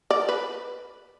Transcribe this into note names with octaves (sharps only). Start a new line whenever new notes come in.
D5
B4